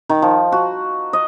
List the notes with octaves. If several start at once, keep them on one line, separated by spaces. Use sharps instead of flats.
D#3
F3
F#4
D#5